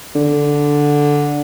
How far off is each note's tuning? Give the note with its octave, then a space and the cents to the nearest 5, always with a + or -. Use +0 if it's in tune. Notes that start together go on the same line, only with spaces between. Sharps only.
D3 -5